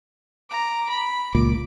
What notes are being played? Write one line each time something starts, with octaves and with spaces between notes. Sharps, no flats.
A#5 D6
B5
C#2 A#2 D6